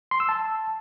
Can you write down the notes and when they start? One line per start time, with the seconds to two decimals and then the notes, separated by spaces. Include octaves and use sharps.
0.11 C6
0.20 E6
0.29 A5